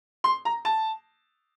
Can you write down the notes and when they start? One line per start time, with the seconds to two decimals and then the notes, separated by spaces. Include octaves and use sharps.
0.24 C6
0.45 A#5
0.65 A5